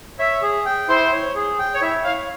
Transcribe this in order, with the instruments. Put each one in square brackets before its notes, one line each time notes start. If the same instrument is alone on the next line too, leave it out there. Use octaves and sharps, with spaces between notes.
[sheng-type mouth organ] C#5 [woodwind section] E5
[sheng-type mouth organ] G#4
G5
[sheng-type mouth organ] E4 [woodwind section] C5
[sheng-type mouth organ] C#5
G#4
G5
[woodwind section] C#5
[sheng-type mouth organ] E4 [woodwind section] E5
[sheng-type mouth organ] C#5 [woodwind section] F5